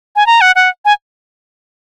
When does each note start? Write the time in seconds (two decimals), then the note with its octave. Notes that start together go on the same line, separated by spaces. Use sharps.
0.16 G#5
0.27 A#5
0.41 F#5
0.56 F#5
0.85 G#5